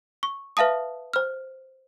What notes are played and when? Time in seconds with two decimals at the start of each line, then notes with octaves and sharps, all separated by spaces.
0.23 C#6
0.57 B4 E5 F5 A5 D#6
1.13 C5 F6